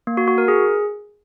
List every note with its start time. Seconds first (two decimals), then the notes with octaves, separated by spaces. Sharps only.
0.07 A#3
0.17 F#4
0.28 F#4
0.38 A#4
0.48 G#4